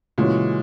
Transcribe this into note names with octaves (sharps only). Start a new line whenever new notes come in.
A#2 C#3 E3 G#3 C#4 F#4